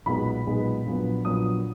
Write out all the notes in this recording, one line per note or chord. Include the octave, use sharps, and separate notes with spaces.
B1 A#2 G#3 B3 B5
B1 A#2 G#3 B3
A#1 A#2 F#3 B3
A#1 A#2 F#3 B3 D#6